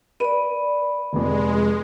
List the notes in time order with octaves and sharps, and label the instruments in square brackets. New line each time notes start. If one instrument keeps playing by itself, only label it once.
[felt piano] B4 D#7 [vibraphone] D5 B5
[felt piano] F1 F2 [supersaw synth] G#3